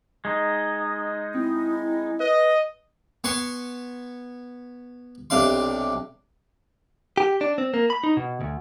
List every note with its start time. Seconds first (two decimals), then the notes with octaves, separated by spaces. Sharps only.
0.25 G#3 D#4
1.35 C4 E4
2.20 B4 D#5
3.24 B3 G#5 C6 C#6
5.30 B1 C3 D4 F5 C6
7.17 G4
7.41 D4
7.58 C4
7.74 A#3
7.90 B5
8.04 D#4
8.17 B2
8.41 D2